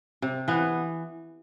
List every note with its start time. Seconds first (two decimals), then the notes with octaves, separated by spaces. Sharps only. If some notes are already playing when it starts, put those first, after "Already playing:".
0.22 C3
0.48 E3 B3